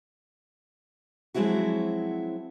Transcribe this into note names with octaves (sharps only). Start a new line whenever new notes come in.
F3 F#3 G#3 C4 E4 F#4